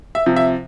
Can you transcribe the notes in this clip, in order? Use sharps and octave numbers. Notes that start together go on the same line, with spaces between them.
E5
C3 F3
E5